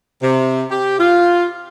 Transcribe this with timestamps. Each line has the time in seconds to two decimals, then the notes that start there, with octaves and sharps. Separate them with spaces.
0.23 C3
0.71 G4
0.99 F4